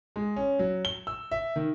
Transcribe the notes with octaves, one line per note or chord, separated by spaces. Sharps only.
G#3
C#4
F#3
G7
E6
E5
D#3